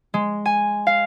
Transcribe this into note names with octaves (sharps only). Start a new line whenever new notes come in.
G#3
G#5
F5